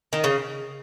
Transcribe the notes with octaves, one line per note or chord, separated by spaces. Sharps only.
D#3
C#3